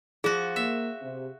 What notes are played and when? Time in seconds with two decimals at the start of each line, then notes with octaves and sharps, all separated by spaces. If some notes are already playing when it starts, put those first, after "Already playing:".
0.24 F3 F#4 G#4
0.56 A#3 E5
1.02 C3